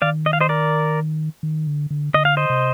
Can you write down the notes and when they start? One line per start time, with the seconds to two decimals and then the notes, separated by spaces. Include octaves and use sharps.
0.02 D#3 D5 F5
0.26 D#5
0.33 F5
0.41 C5 D#5
0.49 A#4 D5
1.43 D#3
1.67 D3
1.90 D3
2.14 D3 D#5
2.25 F5
2.37 C5 D#5
2.50 C3